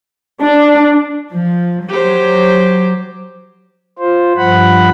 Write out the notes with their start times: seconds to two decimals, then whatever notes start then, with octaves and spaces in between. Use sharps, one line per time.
0.41 D4
1.34 F3
1.89 F#3 G4 C5
3.99 F4 C5
4.37 G2 F3 F#5 B5